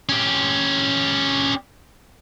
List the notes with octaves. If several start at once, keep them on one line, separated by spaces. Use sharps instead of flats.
C#4 G4